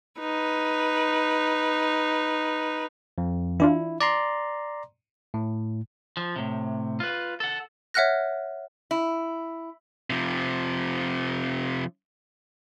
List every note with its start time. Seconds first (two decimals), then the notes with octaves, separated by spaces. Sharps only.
0.20 D#4 B4
3.18 F2
3.60 E3 D4 E4 F4
4.01 D5 A#5 C6
5.34 A2
6.17 F3
6.36 A2 C3
7.00 F4 B4
7.40 A4 F#5
7.94 C#5 E5 F#5 F6 F#6 A#6
8.91 E4
10.10 C3 F3